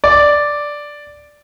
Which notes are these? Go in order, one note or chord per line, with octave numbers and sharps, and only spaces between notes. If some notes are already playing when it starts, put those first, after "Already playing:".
D5